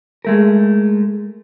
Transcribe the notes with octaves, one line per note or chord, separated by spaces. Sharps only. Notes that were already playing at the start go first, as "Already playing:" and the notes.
G#3 A3 A#4